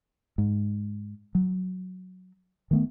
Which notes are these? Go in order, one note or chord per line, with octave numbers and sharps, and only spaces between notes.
G#2
F#3
D#3 A3 B3